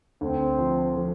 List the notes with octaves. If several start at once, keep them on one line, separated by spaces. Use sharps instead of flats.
D2 C4
F3
F3